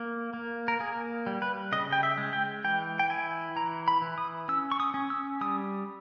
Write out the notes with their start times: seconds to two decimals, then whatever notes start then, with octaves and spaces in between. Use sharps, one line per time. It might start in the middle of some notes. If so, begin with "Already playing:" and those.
Already playing: A#3
0.34 A#3
0.68 A#4
0.80 A#3 G#4
1.27 G3
1.42 B4
1.72 C#3 D#5
1.92 G5
2.03 E5
2.17 G#3
2.33 G5
2.64 E3 G5
2.99 G5
3.10 E4 G#5
3.56 E3 A#5
3.88 B5
4.02 E3
4.18 D#6
4.48 C#4 E6
4.72 C#6
4.80 D#6
4.94 C#4
5.10 E6
5.41 G3 D#6